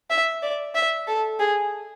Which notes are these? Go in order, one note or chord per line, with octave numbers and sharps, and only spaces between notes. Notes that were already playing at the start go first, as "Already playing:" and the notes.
E5
D5
E5
A4
G#4